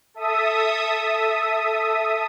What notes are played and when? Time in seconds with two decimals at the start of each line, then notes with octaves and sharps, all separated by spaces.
0.14 A4 E5 D#6